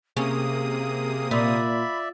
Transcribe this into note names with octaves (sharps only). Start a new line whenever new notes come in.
C3 A#3 C#4 G#4 D#6
A#2 D5 E5 B5